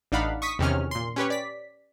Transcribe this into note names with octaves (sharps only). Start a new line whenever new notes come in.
A1 D4 D#4 F5 F#5 B5
C#6 D#6 B6
E2 C3 D#3 C#4 F6
A#2 C6
C#4 G4 B4 C#5
D5 B6